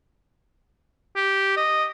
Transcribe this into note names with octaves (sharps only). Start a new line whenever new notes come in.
G4
D#5